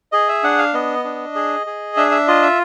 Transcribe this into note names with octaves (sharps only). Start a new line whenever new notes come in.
G#4 D#5
E5
D4 F#5
F5
B3 D#5
D4
G#4
G#4
D4 E5
E5
F4 D#5
E5